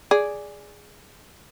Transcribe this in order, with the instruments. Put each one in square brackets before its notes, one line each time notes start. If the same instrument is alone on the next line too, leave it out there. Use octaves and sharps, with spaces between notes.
[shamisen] G#4 D5